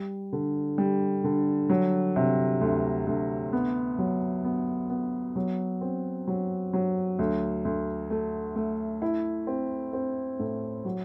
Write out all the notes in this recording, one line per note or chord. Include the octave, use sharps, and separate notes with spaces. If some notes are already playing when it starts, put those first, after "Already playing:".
Already playing: G3
D3
G3
D3
F#3
C3
D2
D2
B3
F#3
B3
B3
F#3
C4
F#3
F#3
D2
D2
A3
A3
E4
C4
C4
A2
F#3